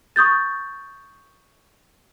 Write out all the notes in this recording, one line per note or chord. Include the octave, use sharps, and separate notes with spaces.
C#6 D#6 G6 A6